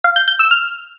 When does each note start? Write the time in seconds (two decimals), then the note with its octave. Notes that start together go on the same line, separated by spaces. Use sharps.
0.04 F5
0.16 G6
0.28 G6
0.39 E6
0.51 F6